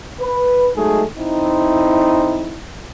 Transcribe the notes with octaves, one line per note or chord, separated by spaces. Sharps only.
B4
F#3 G#3 A3 D#4 G#4
F2 C4 D#4 E4